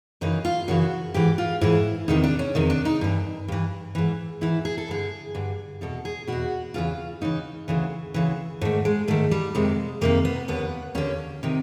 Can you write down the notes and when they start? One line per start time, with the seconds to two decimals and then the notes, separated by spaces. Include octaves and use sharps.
0.21 F#2 C#3 E3 D#4
0.45 F4
0.68 F#2 C#3 E3 F#4
1.14 G#2 E3 G4
1.38 F4
1.61 G#2 E3 E4
2.08 E2 C3 D#3 D#4
2.24 D4
2.39 C#4
2.55 E2 C3 D#3
2.70 D4
2.85 D#4
3.01 G2 E3
3.48 G2 E3
3.95 G#2 E3
4.41 G#2 E3 E4
4.65 G#4
4.78 A4
4.88 G2 D3 G#4
5.35 G2 D3
5.81 E2 B2 A4
6.05 G#4
6.27 E2 B2 F#4
6.74 E2 C#3 E3 F4
7.21 E2 C#3 E3 D#4
7.68 D2 C#3 E3
8.14 D2 C#3 E3
8.61 G#2 D#3 A3
8.85 G#3
9.08 G#2 D#3 A3
9.31 G3
9.55 F2 C3 D#3 G#3
10.01 F2 C3 D#3 A#3
10.25 B3
10.48 D#2 D3 B3
10.95 D#2 D3 C#4
11.43 C3 D#3